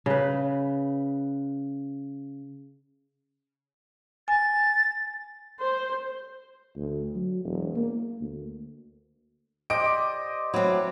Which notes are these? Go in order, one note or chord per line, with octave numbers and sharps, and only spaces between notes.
C#3 B4
G#5 A6
C5
D2
F#3
E1
A#3
D2
G4 C5 D5 D#5 D7
F#3 C4 E4